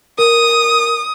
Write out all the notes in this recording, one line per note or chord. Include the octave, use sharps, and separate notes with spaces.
A#4 D#6